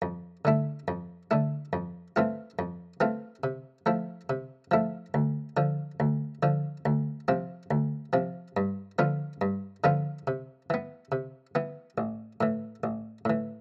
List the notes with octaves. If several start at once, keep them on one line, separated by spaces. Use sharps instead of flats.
F2
D3 A3 E4
F2
D3 A3 E4
F2
E3 A3 C4 F4
F2
E3 A3 C4 F4
C3
F3 A3 E4
C3
F3 A3 E4
D2
D3 F3
D2
D3 F3
D2
C3 F3 C4
D2
C3 F3 C4
G2
D3 F3 B3 F4
G2
D3 F3 B3 F4
C3
E3 B3
C3
E3 B3
A1
A2 E3
A1
A2 E3